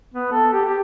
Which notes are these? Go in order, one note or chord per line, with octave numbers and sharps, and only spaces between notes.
B3
A4
G4
G4